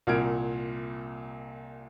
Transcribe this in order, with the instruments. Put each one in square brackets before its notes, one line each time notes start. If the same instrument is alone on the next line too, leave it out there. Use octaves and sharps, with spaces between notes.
[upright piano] C2 A#2 F6 G#6 D7